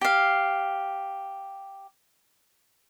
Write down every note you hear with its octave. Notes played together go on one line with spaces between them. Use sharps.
G4 F5